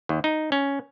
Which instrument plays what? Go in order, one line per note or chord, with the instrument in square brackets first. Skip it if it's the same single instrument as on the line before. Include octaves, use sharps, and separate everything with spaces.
[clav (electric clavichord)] D#2
D#4
C#4